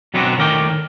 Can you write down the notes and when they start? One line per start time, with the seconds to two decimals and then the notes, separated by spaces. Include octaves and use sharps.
0.14 B2 F#3 B3 C4 D4 F#4
0.38 A2 D#3 A#4 D5 G5